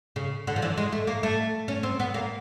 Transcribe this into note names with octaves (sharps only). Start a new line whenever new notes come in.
C#3
D3
F3
E3
G#3
A3
A#3
A3
C#4
C4
B3
A#3